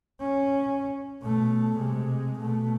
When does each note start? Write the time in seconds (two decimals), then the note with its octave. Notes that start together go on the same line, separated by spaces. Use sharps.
0.20 C#4
1.22 B2 A3
1.80 C3 G#3
2.39 B2 A3